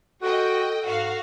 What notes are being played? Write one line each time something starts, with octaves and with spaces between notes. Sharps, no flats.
F#4 A4 D#5 G5
G#2 F#4 F5